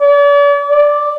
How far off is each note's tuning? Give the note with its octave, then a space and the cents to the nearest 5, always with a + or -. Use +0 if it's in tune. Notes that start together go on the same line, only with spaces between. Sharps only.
D5 -45
D5 +0